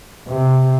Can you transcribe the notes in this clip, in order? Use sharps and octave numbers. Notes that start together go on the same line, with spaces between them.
C3